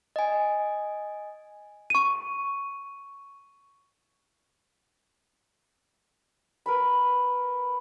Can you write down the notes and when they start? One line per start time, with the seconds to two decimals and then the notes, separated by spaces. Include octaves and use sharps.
0.16 D#5 G#5
1.90 C#6 D#7
6.66 A#4 B4 B5